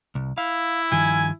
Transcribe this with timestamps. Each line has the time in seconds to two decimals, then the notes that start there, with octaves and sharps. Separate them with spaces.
0.15 C2
0.38 E4 F5
0.92 G2 D#3 F3 G#5